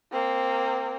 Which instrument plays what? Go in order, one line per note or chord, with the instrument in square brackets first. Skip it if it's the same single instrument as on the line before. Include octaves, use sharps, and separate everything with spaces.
[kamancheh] A#3 C4